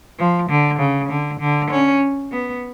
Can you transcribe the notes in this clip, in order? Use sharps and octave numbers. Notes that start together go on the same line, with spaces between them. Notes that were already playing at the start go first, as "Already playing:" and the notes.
F3
D3
C#3
D3
D3
C#4
B3